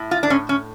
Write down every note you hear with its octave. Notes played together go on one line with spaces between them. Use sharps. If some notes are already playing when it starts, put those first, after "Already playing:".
Already playing: A2
F4
D4
A2 C#4
C#4